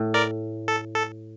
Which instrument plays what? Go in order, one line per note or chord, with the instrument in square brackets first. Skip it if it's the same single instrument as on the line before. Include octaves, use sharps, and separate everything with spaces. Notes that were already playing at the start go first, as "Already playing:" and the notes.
Already playing: [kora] A2
[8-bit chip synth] A#4 D5
A4
A4